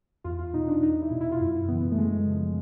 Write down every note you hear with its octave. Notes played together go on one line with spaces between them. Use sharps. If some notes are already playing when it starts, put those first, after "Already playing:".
E2 F4
F4
B2 D#4
D4
E2 D#4
E4
B2
E4
F4
F#2 E4
E4
C#3 E3 B3
A3
F#2 G#3
C#3 F3